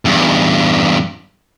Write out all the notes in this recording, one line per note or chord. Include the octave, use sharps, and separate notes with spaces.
E2 G2